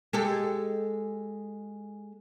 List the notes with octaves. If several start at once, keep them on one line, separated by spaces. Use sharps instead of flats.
G#3 G4 A4